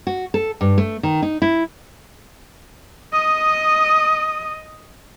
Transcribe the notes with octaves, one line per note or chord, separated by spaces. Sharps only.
F#4
A4
G2
A3
D#3
D#4
E4
D#5 D#6